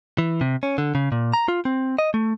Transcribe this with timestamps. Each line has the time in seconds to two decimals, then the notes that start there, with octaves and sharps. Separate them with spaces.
0.18 E3
0.41 C3
0.63 C#4
0.78 D3
0.95 C#3
1.12 A#2
1.33 A#5
1.48 F4
1.65 C4
1.99 D#5
2.14 A3